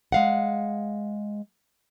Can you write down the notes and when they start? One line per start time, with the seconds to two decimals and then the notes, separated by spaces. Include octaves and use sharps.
0.12 G#3 F5 F#5